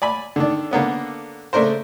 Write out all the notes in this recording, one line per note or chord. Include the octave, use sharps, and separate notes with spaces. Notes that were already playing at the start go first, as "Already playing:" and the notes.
D5 G#5 B5
D3 D#3 D4
D3 A#3 B3 C#4
C#3 A3 D4 A#4 C5